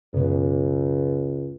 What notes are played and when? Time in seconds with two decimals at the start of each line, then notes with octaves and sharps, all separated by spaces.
0.14 C#2 F#2 B2